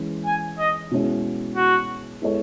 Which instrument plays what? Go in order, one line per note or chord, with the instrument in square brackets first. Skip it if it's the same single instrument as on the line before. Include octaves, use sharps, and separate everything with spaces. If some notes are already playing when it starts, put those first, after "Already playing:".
Already playing: [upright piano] E3 G#3 C#4
[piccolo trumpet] G#5
D#5
[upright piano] B2 G#3 C#4 E4
[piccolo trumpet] F#4
[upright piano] G#3 B3 E4 A4 C#5